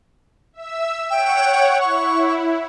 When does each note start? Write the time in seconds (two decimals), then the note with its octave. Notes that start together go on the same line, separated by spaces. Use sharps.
0.53 E5 E6
1.10 C#5 F#5 G5
1.81 E4 C#6